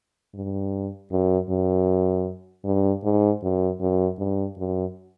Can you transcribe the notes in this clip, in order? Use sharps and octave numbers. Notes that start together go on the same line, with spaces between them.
G2
F#2
F#2
G2
G#2
F#2
F#2
G2
F#2